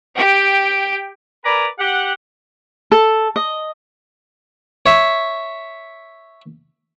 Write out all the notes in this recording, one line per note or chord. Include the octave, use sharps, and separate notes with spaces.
G4 G5
A#4 B4 D5 G#5 A#5 B5
G4 F#5
A4
D#5
C#5 E5